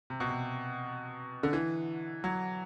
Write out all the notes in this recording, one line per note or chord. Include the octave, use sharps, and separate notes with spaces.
C3
B2
C3
D3
E3
F#3